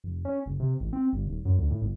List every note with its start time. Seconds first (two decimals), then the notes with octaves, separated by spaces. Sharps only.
0.04 F1
0.25 C#4
0.46 F#1
0.60 C3
0.80 A1
0.93 C4
1.13 G1
1.26 D#1
1.45 F#2
1.58 D2
1.71 A2
1.82 G1